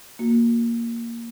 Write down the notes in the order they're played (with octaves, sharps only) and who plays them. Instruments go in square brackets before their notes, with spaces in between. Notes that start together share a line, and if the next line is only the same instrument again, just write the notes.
[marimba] A#3 F#4